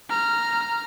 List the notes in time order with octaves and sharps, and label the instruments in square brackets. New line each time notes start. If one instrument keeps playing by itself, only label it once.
[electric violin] A#5 F6